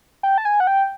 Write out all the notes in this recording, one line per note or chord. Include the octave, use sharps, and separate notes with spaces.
G5
A5
G#5
F#5
G5